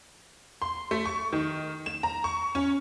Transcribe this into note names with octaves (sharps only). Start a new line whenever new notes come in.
C6
A3
C#6
D#3
E7
A#5
C#6
C#4